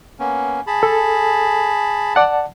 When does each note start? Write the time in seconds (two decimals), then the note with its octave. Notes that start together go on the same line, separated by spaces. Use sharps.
0.19 A#3 B3 C#4
0.67 G#4 A5 B5
0.83 A4
2.15 D5 F#5 A5